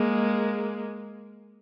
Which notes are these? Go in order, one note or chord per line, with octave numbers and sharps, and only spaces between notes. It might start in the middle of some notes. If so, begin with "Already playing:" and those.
Already playing: G#3 A#3